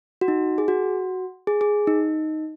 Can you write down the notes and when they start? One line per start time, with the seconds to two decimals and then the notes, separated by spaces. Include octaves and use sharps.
0.21 F#4
0.28 D#4
0.58 G#4
0.68 F#4
1.47 G#4
1.61 G#4
1.87 D#4